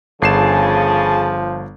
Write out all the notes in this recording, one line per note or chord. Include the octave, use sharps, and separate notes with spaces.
G1 C#3 F3 G#4 A5 C7 E7